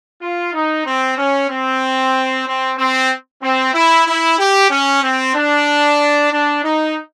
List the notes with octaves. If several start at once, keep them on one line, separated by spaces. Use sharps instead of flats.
F4
D#4
C4
C#4
C4
C4
C4
C4
E4
E4
G4
C#4
C4
D4
D4
D#4